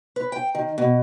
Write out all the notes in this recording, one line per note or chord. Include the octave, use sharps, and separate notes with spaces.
B4
G5
D#3
B2